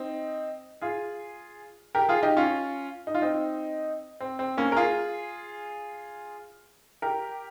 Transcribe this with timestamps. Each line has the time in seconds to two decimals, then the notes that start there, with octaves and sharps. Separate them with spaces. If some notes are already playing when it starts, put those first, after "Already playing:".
Already playing: C4 D#4
0.81 F4 G#4
1.95 G4 A#4
2.09 F4 G#4
2.23 D#4 G4
2.37 C#4 F4
3.07 D#4
3.15 F4
3.22 C4 D#4
4.20 C4
4.39 C4
4.58 A#3 C#4
4.72 A#4
4.76 F4 G#4
7.02 G4 A#4